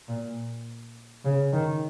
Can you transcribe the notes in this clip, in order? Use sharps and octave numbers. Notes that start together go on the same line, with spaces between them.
A#2
C#3
D#3